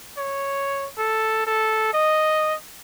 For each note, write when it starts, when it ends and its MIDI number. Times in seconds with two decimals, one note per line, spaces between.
0.17 0.86 73
0.98 1.45 69
1.47 1.89 69
1.94 2.54 75